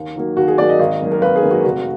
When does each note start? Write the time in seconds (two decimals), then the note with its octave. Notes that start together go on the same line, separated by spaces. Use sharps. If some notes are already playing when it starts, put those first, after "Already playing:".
Already playing: D#2
0.16 D#3 F#3 A#3
0.37 D#2 F#4
0.48 G#4
0.58 D#3 F#3 A#3 D5
0.69 D#5
0.79 G#1
1.01 F#2 D#3 A#3
1.12 A#4
1.22 G#1 B4
1.36 G#4
1.43 F#2 D#3 A#3
1.51 F#4
1.64 F1 F#4